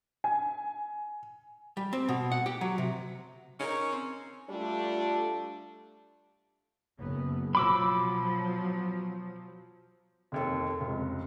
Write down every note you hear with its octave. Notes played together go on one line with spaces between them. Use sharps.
G#5
G3
C4
B2
F#5
G4
F#3
C3
C#4 D#4 A#4 C#6
C4
G3 A3 D4 F4 A4
F#1 B3
B2 F3 F#3 B5 D6 E6
F1 D#2 A4
F1 C#2